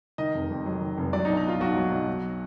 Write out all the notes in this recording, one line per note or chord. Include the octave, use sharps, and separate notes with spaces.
D#3 D#5
F1
F2
F#3
D#3
F1
F#3 D5
D#4
B1
D#4
B2 F4
B1 F#4
F#3
B1
F#3